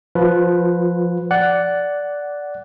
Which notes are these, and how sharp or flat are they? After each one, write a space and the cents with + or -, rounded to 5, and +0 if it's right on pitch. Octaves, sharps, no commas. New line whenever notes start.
F3 +0 F4 +30 B4 +0
D5 -10 F#5 +5